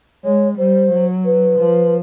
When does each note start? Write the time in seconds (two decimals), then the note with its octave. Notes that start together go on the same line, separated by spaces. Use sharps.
0.24 G#3 C#5
0.58 G3 C5
0.91 F#3
1.25 B4
1.59 F3